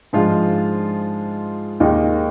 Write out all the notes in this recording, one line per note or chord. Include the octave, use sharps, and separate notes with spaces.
G#2 F3 G#3 D4 F4
D#2 D#3 G#3 D#4